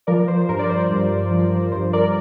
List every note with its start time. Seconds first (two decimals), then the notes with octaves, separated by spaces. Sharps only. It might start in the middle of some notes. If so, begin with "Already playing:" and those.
0.07 F3 A#4 D5
0.28 C5
0.49 G2 A#4
0.59 D5
0.69 C5
0.90 G2
1.31 F3
1.72 G2 C5
1.93 A#4 D5